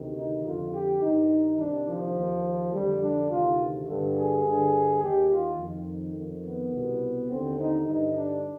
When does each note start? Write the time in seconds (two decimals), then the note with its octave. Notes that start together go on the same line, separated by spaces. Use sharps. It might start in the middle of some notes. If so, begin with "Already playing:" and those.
Already playing: D2 C3 D#3
0.15 D#4
0.44 F2 D3 F4
0.72 G4
1.01 G2 D#3 D#4
1.58 C2 C3 D#3 D4
1.87 F3
2.16 D#2 D#3
2.73 F2 D3 G3
3.01 D4
3.30 D2 C3 D#3 F4
3.87 G2 D3
4.16 G#4
4.45 G2 D3
5.01 D#2 D#3 G4
5.31 F4
5.58 F2 D#3
6.16 F2 D#3
6.45 B3
6.73 C2 B2
7.30 D#2 D3 C4
7.59 D#4
7.87 G2 D3 D#4
8.16 D4